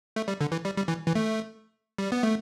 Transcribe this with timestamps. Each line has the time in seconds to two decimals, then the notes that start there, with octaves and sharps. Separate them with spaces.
0.16 A3
0.28 G3
0.41 D3
0.52 E3
0.65 G3
0.77 G3
0.88 E3
1.07 E3
1.15 A3
1.98 G3
2.12 B3
2.23 A3